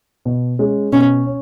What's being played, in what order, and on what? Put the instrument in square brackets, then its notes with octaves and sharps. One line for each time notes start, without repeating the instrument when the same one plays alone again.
[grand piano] B2
G#3 C#4
[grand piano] B2 [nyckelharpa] C#4
[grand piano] C#4